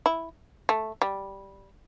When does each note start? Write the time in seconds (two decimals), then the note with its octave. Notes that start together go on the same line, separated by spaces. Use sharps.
0.06 E4
0.69 A3
1.02 G3